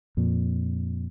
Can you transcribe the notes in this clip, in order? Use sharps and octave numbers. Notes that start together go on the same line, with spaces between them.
F2 A#2